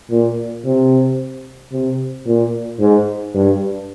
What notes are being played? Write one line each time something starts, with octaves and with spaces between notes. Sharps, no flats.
A#2
C3
C3
A#2
G#2
G2